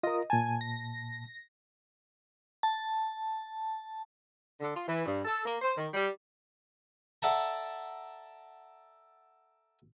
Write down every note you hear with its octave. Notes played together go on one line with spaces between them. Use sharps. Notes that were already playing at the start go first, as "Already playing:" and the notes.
F4 A#4 D#5
A#2 G#5 A5
A#6
A5
D3
F4
E3
G2
A4
A#3
C5
D#3
G3
A4 D5 E5 F#5 A5 A#5